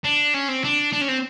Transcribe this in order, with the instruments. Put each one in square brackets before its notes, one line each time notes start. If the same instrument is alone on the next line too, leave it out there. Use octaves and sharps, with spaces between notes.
[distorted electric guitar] D4
C#4
C4
D4
D4
C#4
C4